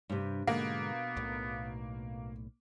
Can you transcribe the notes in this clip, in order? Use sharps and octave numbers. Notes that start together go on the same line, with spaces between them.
G2 C3
G#2 B2 D3 G#3 A#3 B3 F#5
B1 A2